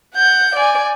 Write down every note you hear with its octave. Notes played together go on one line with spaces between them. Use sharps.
F#5 G6
D5 G#5